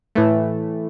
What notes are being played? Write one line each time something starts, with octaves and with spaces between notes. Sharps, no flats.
A2 E3 A3